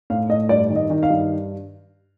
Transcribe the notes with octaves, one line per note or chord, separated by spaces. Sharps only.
A2 F5
A2 D#5
G2 D5
D#3
D#5
D#3
F5
G2